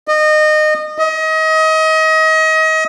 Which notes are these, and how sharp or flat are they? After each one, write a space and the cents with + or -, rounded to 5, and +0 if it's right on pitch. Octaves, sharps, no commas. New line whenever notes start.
D#5 -25
D#5 +30